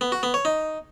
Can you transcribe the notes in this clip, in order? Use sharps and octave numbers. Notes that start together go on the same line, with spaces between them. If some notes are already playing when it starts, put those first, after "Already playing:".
B3
F#4
B3
C#5
D#4